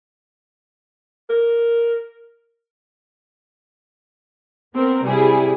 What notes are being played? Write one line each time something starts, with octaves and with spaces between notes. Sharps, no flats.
A#4
B3 C4 A#4
C3 G3 E4 G#4